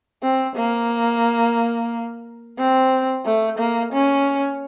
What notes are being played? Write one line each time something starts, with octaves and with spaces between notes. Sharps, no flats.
C4
A#3
C4
A3
A#3
C#4